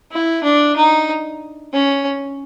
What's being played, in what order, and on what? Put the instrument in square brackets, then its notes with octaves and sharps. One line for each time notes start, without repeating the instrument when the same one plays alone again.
[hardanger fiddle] E4
D4
D#4
C#4